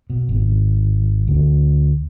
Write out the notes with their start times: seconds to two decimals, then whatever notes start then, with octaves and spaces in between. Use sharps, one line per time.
0.10 B2
0.29 G#1
1.28 D2